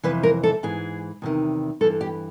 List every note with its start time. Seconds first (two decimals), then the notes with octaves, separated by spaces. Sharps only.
0.03 F2 C3 E3 B4
0.23 A#4
0.43 A4
0.63 G#2 E3 G#4
1.22 E2 C3 D#3
1.81 G2 A4
1.84 E3
2.01 G4